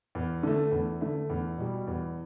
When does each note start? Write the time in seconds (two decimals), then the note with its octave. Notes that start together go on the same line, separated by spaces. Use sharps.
0.15 E2
0.43 D3 A3
0.72 E2
1.01 D3 A3
1.30 E2
1.58 B2 G3
1.87 E2